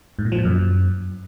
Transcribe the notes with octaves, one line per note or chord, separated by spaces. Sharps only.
G#2
A#2
F3
A#2
F#2